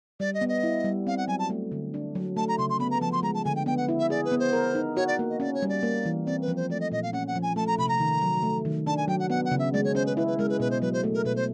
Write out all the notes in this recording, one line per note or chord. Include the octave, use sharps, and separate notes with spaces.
G3 D5
D#5
B3
D#5
E4
G3
C4 F5
F#5
F#3 G#5
A5
A3
D3
D4
F#3
A3 A5
A#5
C#3 C6
C6
B3 B5
A#5
F3 A5
C6
G#3 A#5
A5
D3 G#5
G5
B3 G5
F#5
E4
E5
G#4 D5
B4
B3
C5
A#4
D#4
F#4 C#5
D5
A#3
D#5
C#4 D5
C#5
G3
D5
A#3
E3
C4 D5
B4
F3
C5
A3 D5
D#5
A#2 D#5
F5
C#4 F#5
F#5
F3
G#5
A3 A5
A#5
C3 B5
A#5
D#3
F#3
A3
D#3
D4 A5
G#5
F#3 G5
F#5
B3 F#5
F#5
C#3
E5
G#3 D5
C#5
C#4 C5
B4
E4 B4
B4
G#3 A#4
B4
B2 B4
C5
F#3 B4
C5
A3
A#4
B2 B4
C5